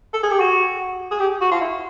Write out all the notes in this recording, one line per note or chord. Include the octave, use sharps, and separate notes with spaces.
A4
G#4
G4
F#4
G#4
G4
F#4
F4
E4